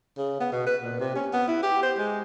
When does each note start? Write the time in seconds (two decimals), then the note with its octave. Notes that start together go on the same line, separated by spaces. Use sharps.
0.18 C#3
0.40 B3
0.52 B2
0.66 B4
0.82 A#2
1.00 C3
1.15 C#4
1.33 B3
1.48 E4
1.63 G4
1.83 C5
1.98 G#3